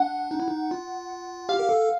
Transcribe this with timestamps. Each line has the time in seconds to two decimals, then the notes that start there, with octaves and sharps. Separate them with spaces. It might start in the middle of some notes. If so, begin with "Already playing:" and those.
Already playing: D4 F#5
0.31 D#4
0.40 E4
0.48 D#4
0.71 F4
1.49 G4 F5
1.59 A#4
1.69 A4